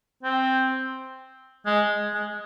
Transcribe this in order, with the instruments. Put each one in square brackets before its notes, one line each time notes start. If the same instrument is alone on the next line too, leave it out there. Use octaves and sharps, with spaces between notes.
[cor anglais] C4
G#3
G#3